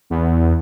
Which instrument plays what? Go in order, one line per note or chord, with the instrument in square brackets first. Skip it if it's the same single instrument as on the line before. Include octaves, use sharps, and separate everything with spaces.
[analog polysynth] E2